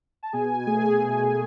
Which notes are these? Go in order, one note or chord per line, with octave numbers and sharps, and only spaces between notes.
A5
B2 G#4 G#5
A3 G#4 G#5
B2